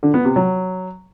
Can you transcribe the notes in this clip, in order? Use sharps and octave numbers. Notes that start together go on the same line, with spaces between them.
D3
B3
C3
F#3